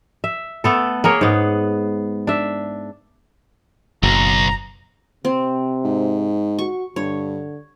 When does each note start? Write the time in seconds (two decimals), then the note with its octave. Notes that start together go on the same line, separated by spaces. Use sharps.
0.24 E5
0.64 A3 B3 A4
1.04 A#3 G#4 A#4 C#5
1.21 G#2 B3
2.27 D4 E5
4.03 F#1 B1 A#5
5.25 C3 C4
5.84 G#2
6.59 F#4 C#6
6.96 G2 D3 C#5